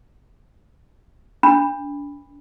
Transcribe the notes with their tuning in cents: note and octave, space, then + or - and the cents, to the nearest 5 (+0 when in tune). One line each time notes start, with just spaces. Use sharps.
D4 -30 B5 +0